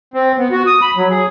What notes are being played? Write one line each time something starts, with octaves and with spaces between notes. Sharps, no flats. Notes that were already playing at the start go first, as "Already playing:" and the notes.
C4
B3
F#4
D#6
B5
F#3
G#4